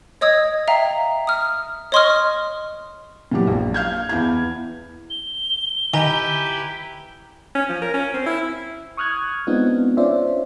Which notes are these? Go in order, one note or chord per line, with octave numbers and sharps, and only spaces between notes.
C#5 D#5 D#6 E6 G#6
E5 F5 G5 A#5
D#6 F6
C#5 D#5 C6 C#6 D#6 F6
A#2 E3 F#3 G4
A#1
F5 F6 G6 G#6
E2 E4 G#6
G7
D#3 E4 G4 B4 G#5 A#5
C#4
F3
A#4
C#4
C4
E4
C#6 D#6 F6 F#6 G#6
G#3 B3 C4 D4 D#4 F4
C#4 D4 F4 C5 D5 E5